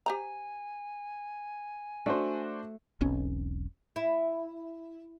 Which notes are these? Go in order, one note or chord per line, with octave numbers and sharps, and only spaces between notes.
G4 C5 G#5 A#5
A3 D4 F#4 C5
E1 B1 C4 C#4
E4